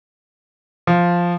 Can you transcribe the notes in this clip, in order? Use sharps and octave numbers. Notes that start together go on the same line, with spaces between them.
F3